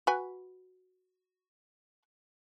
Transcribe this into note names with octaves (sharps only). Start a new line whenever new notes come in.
F#4 B4 G#5